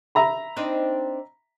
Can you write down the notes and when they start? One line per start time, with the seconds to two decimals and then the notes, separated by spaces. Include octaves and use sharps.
0.15 E5 A#5 B5
0.56 C4 D4 D#4